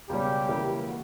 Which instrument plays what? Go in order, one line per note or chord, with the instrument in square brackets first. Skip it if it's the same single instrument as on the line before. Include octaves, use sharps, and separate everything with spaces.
[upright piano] C#2 B2 G3 C#4 [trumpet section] G4
[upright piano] C#2 C#3 E3 A#3 E4
F#4